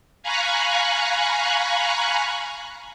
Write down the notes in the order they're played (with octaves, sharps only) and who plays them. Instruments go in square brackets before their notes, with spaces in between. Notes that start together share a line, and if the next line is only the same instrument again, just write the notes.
[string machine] F5 G#5 A#5 B5 C#6 F#6